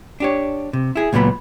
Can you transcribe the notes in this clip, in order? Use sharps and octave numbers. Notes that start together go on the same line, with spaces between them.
D4 G4 C#5
C3
E4 G#4
C#2 A#2 F#3 B3 B5